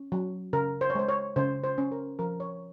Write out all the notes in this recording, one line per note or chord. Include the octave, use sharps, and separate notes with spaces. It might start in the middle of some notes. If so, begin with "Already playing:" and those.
Already playing: C#4
F#3
C#3 A#4
C5
C#5
G#3 C5
C#5
C#3 C5
C5
C#4
A#4
F3 A#4
C#5